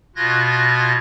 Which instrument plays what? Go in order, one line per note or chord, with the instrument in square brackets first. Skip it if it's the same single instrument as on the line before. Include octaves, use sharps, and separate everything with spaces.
[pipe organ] B2 F4 F#6 G#6 A#6